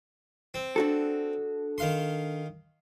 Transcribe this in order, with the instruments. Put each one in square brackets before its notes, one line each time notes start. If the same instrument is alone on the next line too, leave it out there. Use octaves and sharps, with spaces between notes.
[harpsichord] C4
[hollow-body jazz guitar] D4 F#4 A4
[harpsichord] D#3 F5 C6